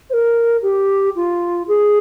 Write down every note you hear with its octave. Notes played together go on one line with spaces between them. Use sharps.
C5
A#4
G4
F4
G#4